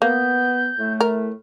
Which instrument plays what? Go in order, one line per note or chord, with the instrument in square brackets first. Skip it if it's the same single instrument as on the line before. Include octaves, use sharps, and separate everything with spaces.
[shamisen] A#3 [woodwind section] B3 [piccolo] G6
[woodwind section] A2 A3
[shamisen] A#4